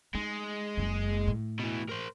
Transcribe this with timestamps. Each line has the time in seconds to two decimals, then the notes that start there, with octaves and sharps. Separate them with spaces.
0.15 G#3 D#4
0.77 F#1 F#2
1.28 A2
1.60 B2 E3
1.89 A#4 C5